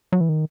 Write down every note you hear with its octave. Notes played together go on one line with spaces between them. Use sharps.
F#3
E3
D#3